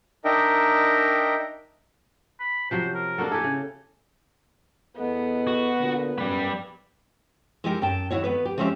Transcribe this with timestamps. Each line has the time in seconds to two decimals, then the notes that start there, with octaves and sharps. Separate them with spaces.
0.25 D4 D#4 A#4 D#5 E5 G5
2.40 B5
2.71 C3 F3 F#3 C5
2.95 A#4
3.18 F#3 A#3 D4 F#4 A4
3.32 E4 G4 A4 G#5
3.44 C#3
4.97 E2 B3 A4 D#5
5.47 F#4
5.79 A#2 D3
6.18 F#2 G3 B4
7.64 G#3 D#4 E4 G4 G#4 A#4
7.82 F#2 G5 A5
8.11 D#2 C#3 E4 F#4 C#5
8.24 D#3 B3 B4
8.45 G4
8.58 F3 G#3 C4 C#4 G4 E5